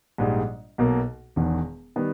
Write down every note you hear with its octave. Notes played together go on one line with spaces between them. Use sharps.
A#1 G#2 G3
B1 B2 A#3
E1 E2 D#3
D#3 G3 B3